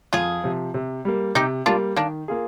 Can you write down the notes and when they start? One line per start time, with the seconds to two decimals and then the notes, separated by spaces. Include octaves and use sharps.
0.13 F2 F4 G#4
0.44 C3 F3
0.74 C3
1.05 G3 A#3
1.35 C3 D#4 G4
1.66 G3 A#3 D4 F4
1.96 D#3 A#3 D4
2.28 A#3 F4 G#4